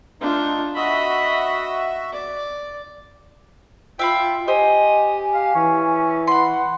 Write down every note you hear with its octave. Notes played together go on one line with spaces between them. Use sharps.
A3 D4 D#4 F4
F#4 D#5 E5 B5
D5
F4 E5 F5 G5 B5
G4 C5 D#5 G#5
F5
E3 C#4
F#5 B5 C6